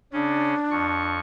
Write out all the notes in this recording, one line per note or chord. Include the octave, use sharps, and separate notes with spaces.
C#3 C#4 D4
F2 C#6